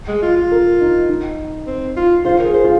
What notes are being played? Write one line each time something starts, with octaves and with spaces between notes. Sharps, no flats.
G#3
F4
F4
A#4
D#4
D#4
C4
F4
F4 C5
G#4 A#4
C5
F4